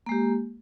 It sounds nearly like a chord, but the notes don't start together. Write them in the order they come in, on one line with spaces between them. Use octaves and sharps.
A#3 G#3 G4